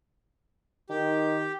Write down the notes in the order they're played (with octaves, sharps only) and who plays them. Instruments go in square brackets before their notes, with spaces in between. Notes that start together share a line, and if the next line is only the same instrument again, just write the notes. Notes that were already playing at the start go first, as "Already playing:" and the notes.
[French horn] D#3 [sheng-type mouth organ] G4